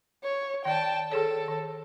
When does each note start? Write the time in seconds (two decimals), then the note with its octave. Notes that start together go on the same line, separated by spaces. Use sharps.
0.24 C#5
0.65 D#3 D5 G5 A5
1.12 D#3 G#4 A4 C#5
1.48 D#3